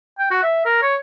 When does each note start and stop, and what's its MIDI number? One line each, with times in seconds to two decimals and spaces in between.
0.19 0.30 79
0.31 0.41 66
0.43 0.64 76
0.66 0.78 70
0.82 0.96 73